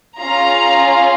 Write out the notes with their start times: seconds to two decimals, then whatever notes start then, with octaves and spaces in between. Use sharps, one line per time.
0.16 C#4 F4 G#4 A#5